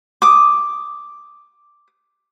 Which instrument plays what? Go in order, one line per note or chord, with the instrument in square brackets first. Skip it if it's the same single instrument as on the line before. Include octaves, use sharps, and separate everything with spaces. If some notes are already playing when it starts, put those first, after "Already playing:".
[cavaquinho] D6 D#6